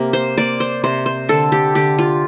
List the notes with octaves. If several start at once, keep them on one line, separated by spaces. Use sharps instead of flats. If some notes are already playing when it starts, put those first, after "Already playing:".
Already playing: C3 A#3 G4
C5
A#3 D5
C5
C3 C5
C5
D3 A4
G4
D3 G4
F4